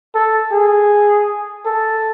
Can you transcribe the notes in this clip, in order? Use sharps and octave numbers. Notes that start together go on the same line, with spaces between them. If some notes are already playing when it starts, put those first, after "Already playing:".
A4
G#4
A4